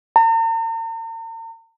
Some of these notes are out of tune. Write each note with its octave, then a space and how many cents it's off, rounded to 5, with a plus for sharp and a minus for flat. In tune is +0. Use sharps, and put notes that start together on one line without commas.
A#5 -45